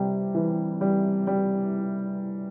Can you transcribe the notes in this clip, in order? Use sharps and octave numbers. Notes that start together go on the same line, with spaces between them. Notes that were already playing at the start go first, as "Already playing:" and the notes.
Already playing: C3 G3
E3
G3
G3